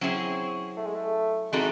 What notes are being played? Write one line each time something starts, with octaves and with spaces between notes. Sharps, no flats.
F#3 C4 C#4 E4 G#4
A3
G#3
A3
E3 G#3 C4 D#4 F#4 A4